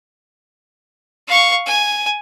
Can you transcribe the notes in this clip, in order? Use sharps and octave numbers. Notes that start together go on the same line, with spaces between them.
F5 C#6
G#5